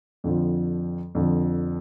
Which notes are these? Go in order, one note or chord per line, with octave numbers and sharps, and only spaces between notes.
F2 D3 F3
F2 D3 F3